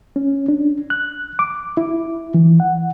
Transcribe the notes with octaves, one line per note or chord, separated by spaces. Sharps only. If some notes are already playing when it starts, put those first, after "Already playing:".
C#4
D4
F#6
D6
E4
E3
F#5